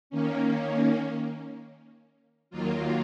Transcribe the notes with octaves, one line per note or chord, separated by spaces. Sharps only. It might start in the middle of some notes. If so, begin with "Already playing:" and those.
D#3 A#3 C#4
D#2 D#3 F#3 A#3 F4